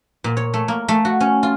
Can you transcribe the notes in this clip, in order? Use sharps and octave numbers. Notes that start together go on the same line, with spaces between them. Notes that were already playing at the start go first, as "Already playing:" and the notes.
A#2
C#5
A3
A#3
A3
F#4
C#4
F4